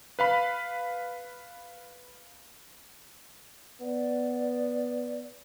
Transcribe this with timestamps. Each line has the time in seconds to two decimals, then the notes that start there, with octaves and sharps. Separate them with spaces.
0.19 B4 F5 B5
3.81 B3 D5